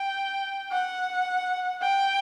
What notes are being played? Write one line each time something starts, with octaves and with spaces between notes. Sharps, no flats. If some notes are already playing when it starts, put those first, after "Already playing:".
Already playing: G5
F#5
G5